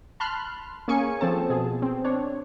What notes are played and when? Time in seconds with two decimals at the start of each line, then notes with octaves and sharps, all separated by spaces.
0.20 A5 B5 C6 F6 F#6
0.88 A#3 C#4 G#4 G#5 C#6 C#7
1.21 F3 C4 A4 A5
1.50 B2 G#4
1.82 C4
2.05 D4 C#5